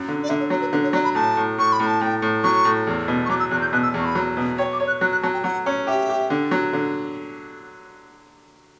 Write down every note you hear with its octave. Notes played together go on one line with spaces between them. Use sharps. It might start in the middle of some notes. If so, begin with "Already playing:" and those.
Already playing: F#2 F#3
D3
D5
D3 E5
C#5
F#3 C#5
B4
D3 B4
C#5
F#3 D5
B5
A2 A5
A2
A2 C#6
B5
A2
A5
A2 G5
A2
F#3 C#6
A2
E2
B2
C#6
F#3 D6
E6
E2 F#6
G6
B2 F#6
E6
E2
C#6
B5
F#3
B2
C#5 G5
D6
C#5
F#6
F#3 F#6
F#6
F#3 A5
G5
F#3 F#5
C#4
G4 E5
G4
D3
F#3
D3